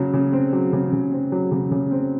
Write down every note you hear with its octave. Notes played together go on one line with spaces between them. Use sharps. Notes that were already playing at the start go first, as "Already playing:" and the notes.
Already playing: C#3 F#3
C#3
C4
F#3
C#3
C#3
C4
F#3
C#3
C#3
C4